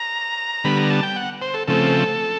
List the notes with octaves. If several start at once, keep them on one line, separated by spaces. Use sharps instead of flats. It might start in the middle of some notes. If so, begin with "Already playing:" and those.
Already playing: A#5
D3 G3 B3 B5
A#5
A5
G5
F#5
C5
A4
C#3 F3 A3 C4 A4